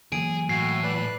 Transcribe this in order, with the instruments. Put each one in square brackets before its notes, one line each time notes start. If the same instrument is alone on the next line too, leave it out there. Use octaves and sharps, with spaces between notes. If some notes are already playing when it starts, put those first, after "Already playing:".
[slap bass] E3 F#3 A#3 [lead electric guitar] G#4 [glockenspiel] D7
[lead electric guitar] A2 [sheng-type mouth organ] F#4 G#5 [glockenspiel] C7
[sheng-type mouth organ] B4 D5 F#6